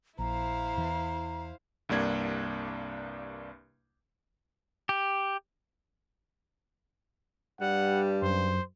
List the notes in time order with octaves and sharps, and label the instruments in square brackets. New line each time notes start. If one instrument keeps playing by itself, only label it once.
[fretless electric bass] A#1 [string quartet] E4 C5 F5 [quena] A#5
[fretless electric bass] E2 E3
[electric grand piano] C2 G2 A#3 D4 G#6
[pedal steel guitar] G4
[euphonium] G2 [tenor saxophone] G3 [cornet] F#5
[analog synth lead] F#2 [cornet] C5